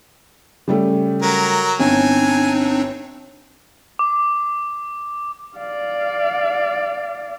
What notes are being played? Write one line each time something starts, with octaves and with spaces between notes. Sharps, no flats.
C#3 G3 A3
F#3 A#4
G1 C4 D4 D#4 G#5
D6
D5 F5